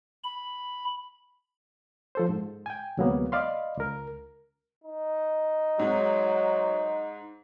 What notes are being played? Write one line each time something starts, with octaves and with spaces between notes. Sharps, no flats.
B5
F3 A4 C5
G#2
G5 G#5
D2 C3 F#3 G#3 A#3 B3
D5 D#5 F5 B5 C6
C#2 A#4
D#4
G#2 F#3 G#3